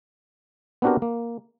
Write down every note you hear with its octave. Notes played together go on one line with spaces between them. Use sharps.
B3 C4 D4 F#4 G4 A#4
A#3